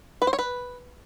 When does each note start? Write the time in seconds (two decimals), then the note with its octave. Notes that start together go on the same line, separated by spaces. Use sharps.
0.22 B4
0.27 C5
0.33 C#5
0.39 B4